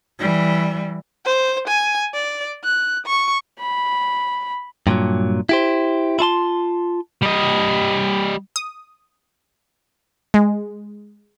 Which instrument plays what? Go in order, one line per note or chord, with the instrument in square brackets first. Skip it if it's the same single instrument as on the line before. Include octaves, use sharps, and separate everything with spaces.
[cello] E3 G3
[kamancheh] C5
G#5
D5
F#6
C#6
[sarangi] B5
[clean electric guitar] G2 A#2 F3 F#3
E4 G4 C5
E4 F4 A5 C6
[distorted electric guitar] G3 D#5
[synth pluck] D#6
G#3